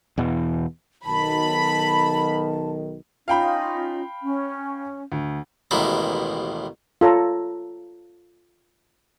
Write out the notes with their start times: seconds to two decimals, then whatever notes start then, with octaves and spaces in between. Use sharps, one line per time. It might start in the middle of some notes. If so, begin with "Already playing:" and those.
0.18 E2 B2 E3
1.06 B1 D#3 A5 B5
3.28 C#4 D#4 F4 F5 G5 B5
4.23 C#4
5.12 D2
5.71 A1 D#2 B2 G#3 E4 A#5
7.01 F4 A4 C#5 A#5